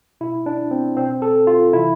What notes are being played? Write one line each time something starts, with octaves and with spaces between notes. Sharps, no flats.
B2 E4
D4
C4
B2 C4
A4
F4
C3 E3 E4